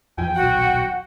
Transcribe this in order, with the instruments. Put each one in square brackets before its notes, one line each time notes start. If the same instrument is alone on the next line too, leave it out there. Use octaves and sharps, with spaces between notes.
[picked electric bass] E2 E3 F3 [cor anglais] G5 [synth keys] G#5
[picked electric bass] D#1 B1 [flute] F#4 [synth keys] F#5